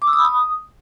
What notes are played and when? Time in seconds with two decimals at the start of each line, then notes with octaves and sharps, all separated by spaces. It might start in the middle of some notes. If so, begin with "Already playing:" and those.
0.02 D6
0.07 E6
0.13 D#6
0.19 B5
0.25 D#6